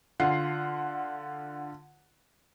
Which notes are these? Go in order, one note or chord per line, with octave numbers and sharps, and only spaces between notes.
D3 F4 F#5 C7